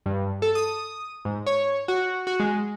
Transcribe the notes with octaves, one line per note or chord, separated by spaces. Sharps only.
G2
A4
D#6
G#2
C#5
F#4
F#4
G#3